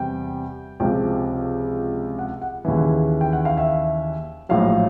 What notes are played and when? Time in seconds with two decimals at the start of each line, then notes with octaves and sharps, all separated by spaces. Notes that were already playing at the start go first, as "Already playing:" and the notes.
Already playing: E2 C3 G3 G5
0.80 C#2 C3 F3 G5
2.19 F#5
2.42 F#5
2.65 D#2 C#3 E3
3.21 G5
3.33 F#5
3.45 F5
3.57 E5
4.49 A#1 A2 F#3 F5